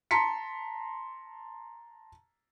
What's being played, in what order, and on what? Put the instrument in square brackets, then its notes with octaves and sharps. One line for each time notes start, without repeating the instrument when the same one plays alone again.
[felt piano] A5 A#5 C6 B6 C#7